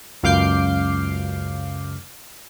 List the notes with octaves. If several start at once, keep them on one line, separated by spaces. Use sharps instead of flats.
C#2 F#2 F5 D6 G6 C7